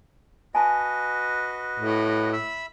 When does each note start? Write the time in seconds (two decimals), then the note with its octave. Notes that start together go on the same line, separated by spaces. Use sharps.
0.55 F#4 B4 D#5 G#5 A5
1.79 A2
2.33 E5 B5 E6